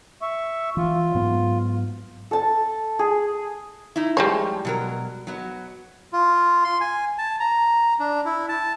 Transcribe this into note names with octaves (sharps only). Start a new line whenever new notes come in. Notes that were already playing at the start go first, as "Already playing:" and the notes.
E5 C#6
E3 F4
G#2 F#3 B3
A4 A5
G#4
D#4 E4
A2 F3 G3 G#3 C5 C#5
B2 F#3 A#4
F#3 B3 D#5
F4
C6
G#5
A5
A#5
D4
E4
A5